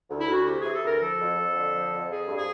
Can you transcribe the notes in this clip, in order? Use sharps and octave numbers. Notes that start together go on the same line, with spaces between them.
D2
E4
D2 F#4
C3 G4
E3 G#4
A4
D2 A#4
F3 A4
F2
F2
D3
F3
F2
F3 G#4
G2
G#4